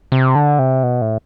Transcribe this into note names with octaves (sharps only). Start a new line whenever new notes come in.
C3
D3
C3
B2
A2